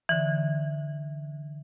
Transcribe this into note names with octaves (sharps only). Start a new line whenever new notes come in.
D3 E3